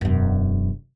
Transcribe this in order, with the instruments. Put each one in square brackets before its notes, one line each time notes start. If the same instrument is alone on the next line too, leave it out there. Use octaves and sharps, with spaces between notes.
[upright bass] E1 F#2